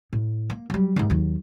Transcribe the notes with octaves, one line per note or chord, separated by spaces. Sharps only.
A2
A#3
F#3 G3
D#2 G#2
D#2 F#3